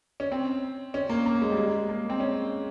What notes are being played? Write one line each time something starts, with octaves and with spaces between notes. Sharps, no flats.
C#4
C4
C#4
A#3
A#3
G#3
G3
G#3
A#3
C4
C#4